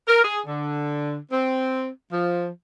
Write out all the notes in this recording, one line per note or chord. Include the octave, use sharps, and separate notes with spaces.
A#4
G#4
D3
C4
F3